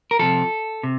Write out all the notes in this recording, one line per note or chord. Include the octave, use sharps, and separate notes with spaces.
A#4
C3 F3 A4
C3